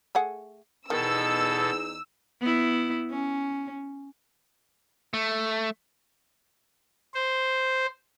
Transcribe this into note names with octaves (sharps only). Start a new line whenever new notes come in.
A3 G#4 F#5
E2 B2 D#3 D#4 A4 E6
B3 E4
C#4
A3
C5